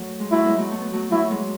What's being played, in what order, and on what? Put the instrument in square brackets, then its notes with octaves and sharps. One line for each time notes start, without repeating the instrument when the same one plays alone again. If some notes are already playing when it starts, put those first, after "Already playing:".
Already playing: [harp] F#3 A3
G#3
[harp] F#3 A3 [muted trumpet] E4
[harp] G#3 B3
F#3 A3
A3
B3
F#3 A3
[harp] F#3 A3 [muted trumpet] E4
[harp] G#3 B3